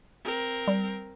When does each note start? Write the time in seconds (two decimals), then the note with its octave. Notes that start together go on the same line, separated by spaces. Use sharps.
0.24 C4 A#4
0.67 G3